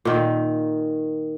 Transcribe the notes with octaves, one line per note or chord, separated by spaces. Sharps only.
A#2 D#3